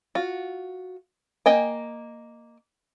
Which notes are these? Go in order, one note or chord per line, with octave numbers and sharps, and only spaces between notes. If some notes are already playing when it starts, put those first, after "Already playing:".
F4 F#4
A#3 D#5 G5 G#5